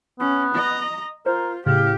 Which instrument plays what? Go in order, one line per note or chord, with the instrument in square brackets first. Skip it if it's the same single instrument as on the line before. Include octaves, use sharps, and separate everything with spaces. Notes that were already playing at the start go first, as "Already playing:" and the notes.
[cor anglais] B3 [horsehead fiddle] C#4
[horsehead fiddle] D#5 A#5
[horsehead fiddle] F4 [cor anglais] A#4 [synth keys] C5
[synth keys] A2 C#3 [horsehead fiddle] G4 [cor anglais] F5